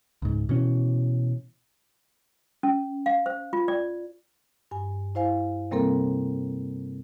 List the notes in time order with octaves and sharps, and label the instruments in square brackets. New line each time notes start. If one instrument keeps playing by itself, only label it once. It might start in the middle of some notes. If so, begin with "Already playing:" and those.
[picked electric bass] C#2 G#2
B2 E3 C#4
[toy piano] C#4
F5
C5
F4
D5
[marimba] G2 G#5
E4 C5 F5 G#5
C3 G3 A#3 C4 A4 A#4